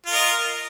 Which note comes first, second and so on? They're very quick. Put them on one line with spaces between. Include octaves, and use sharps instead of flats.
F4 A#4 D#5